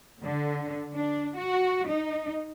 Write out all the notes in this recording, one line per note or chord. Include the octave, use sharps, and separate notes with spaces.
D3
D4
F#4
D#4